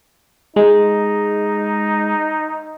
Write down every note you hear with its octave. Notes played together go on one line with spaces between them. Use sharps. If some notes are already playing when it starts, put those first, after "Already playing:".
G#3 D#4